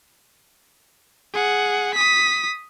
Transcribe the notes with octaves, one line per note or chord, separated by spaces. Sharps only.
G#4 F#5
D#6 B6